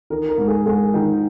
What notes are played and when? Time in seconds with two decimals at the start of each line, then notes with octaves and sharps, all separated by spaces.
0.10 D#3 A#4
0.29 A#4
0.38 G#2
0.48 G#4
0.66 G#2 G#4
0.94 D#3